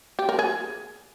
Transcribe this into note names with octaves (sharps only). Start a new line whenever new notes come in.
G4
A#4
G#4